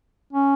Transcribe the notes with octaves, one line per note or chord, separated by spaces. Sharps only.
C#4